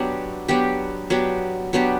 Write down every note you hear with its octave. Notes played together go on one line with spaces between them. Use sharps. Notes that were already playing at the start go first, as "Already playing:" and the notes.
Already playing: F#3 B3 D4 G4
F#3 B3 D4 G4
F#3 B3 D4 G4
F#3 B3 D4 G4